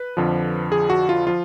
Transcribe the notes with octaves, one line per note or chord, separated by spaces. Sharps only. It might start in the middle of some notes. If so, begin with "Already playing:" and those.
Already playing: B4
F2 D3 F3
G#4
F#4
F4
F3 F4